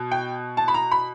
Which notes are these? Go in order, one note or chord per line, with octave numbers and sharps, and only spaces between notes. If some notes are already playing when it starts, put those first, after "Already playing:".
Already playing: B2
G5
A5
B5
A#5
B5